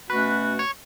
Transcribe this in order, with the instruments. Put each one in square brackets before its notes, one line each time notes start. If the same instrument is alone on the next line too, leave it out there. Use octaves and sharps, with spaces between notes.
[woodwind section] B2 A3 C#4 F#4 [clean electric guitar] B4
[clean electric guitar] C#5